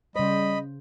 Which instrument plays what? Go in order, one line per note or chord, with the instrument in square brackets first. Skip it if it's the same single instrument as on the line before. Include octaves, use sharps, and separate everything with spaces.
[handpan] C#3 C5 [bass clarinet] G3 [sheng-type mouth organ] D#5 B5